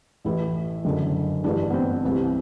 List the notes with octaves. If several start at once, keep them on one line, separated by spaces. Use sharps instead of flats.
A1 A2 E3 E4
F#1 F#2 D3
A1 G2 E3 D4
B3
C4
C2 C3 E3